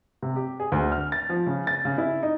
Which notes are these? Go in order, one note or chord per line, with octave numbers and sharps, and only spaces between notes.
C3
G4
G#4
D2
F6
A6
F3
C#3
A6
C#3
E4
D#4